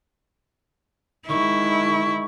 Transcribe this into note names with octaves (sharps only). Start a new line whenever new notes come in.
D#3 G#3 E4 C#6